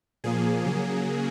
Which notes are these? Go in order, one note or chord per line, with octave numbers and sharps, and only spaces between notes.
A#2 F3 A#3 G#4
C#3 F#3 A#3